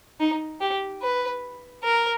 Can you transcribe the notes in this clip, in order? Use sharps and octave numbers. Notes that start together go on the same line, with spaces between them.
D#4
G4
B4
A#4